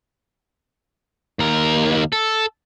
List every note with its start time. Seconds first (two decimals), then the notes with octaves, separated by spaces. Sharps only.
1.39 D#2 A#4
2.13 A4